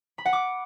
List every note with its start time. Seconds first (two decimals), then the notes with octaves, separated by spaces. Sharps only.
0.18 B5
0.25 F#5
0.33 D6